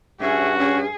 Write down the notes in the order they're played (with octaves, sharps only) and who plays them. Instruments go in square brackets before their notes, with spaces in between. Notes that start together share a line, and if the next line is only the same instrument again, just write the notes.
[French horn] G2 [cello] C#4 G#4 [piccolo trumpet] F#4 [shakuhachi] E5
[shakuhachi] C#4 [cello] G#4